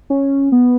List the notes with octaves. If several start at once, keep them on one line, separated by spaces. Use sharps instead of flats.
C#4
B3